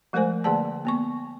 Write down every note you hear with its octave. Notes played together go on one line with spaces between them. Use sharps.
F3 G#3 A3 A#4 C5 G#5
D3 A#3 G#4 D5 F#5 A5
A#3 B3 C#6